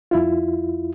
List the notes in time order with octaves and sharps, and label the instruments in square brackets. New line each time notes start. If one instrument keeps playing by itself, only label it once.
[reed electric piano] F2 E4 F4